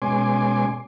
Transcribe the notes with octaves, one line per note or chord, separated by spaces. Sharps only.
B2 G#3 C#4 G#5 C6 D6